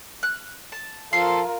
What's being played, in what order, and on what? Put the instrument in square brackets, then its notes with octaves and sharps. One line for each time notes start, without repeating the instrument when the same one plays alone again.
[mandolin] F#6
A5
[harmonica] F3 A4 [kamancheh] F4 A#4 [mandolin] C6